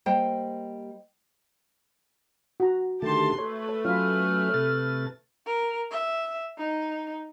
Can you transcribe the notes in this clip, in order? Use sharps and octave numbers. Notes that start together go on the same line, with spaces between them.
G3 A#3 C5 D#5 G5
F#4 A#5
D3 D#3 A3 G4 A5 C6
A3 A4 B4 C#5
F#3 C#4 F4 B5 F6
C3 A4 A6
A#4
E5
D#4